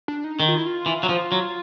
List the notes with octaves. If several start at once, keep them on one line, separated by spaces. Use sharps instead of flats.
D4
D#4
D#3
F4
E4
F4
E3
F#3
F3
F#3